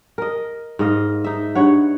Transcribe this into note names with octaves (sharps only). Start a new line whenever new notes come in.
A#4 D#5
G#2 D#5 F5
D#4 E5
G2 C#5 F#5